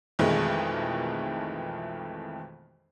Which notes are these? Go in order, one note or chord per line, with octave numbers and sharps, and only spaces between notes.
B1 F2 D#3 E3 G#3 A3